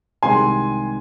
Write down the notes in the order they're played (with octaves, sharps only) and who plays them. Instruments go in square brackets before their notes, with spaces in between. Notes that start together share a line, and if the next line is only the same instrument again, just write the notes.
[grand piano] C2 C3 D#3 G#3 G#5 C6